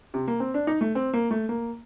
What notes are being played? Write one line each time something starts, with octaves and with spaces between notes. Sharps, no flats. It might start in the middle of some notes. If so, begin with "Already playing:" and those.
C3
A#3
C4
D4
D#4
A3
C4
A#3
A3
A#3